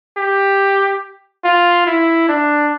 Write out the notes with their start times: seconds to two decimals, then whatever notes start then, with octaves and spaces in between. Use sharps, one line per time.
0.17 G4
1.44 F4
1.87 E4
2.29 D4